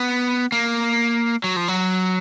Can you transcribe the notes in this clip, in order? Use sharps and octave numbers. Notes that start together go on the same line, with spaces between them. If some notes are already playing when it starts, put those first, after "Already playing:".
Already playing: B3
A#3
F#3
F3
F#3